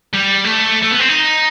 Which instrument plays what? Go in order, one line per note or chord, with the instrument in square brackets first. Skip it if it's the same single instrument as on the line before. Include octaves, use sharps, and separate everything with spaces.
[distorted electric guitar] G3
A3
A3
B3
C4
D#4